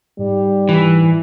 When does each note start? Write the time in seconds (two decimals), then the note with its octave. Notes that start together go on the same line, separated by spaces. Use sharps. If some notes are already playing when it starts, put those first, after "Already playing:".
0.19 G#2 G3
0.69 E3